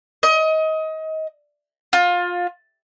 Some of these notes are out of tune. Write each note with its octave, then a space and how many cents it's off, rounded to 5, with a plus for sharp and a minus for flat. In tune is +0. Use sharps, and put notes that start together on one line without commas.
D#5 +25
F4 +20